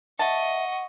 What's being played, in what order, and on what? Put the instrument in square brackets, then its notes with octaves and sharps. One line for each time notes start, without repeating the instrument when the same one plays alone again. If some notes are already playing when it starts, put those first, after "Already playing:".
[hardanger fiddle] D#5 C#6 [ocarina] E5 [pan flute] F#5 [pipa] A5